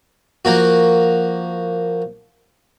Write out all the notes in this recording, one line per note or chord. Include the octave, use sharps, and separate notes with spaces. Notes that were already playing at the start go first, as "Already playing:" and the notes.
F3 A#3 F#4